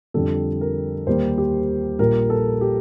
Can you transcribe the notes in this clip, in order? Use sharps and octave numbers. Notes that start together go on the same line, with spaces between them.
F2 D3 G3 A4
A#4
D#2 D#3 G3 A#3 C5
G4
A#1 A#2 G3 A#3 A#4
A4
G4